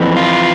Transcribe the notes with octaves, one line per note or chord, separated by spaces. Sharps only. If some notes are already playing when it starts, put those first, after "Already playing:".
Already playing: F2 E3
F4